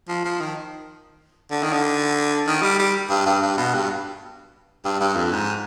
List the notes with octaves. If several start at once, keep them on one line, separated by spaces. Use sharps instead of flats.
F3
F3
D#3
D3
D#3
D3
D#3
G3
G3
G2
G2
G2
B2
G2
G2
G2
F2
G#2